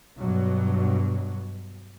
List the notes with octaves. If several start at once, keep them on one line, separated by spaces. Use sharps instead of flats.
G2 B2 F#3